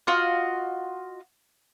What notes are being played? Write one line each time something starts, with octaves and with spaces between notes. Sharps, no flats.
F4 F#4 D#5 D#6